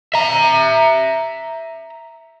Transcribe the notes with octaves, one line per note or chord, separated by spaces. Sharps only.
E5 A#5